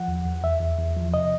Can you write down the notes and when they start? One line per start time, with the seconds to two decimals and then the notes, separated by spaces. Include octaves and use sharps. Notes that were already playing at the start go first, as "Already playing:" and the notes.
Already playing: F3 F#5
0.08 E2
0.25 E2
0.43 E2 E5
0.61 E2
0.79 E2
0.96 F3
1.14 C3 D#5